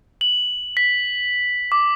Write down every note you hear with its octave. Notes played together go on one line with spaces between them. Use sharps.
F#7
B6
D6